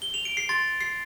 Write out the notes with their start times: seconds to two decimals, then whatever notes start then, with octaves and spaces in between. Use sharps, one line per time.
0.02 G7
0.14 F7
0.25 D7
0.37 C7
0.49 C6 A6
0.81 C7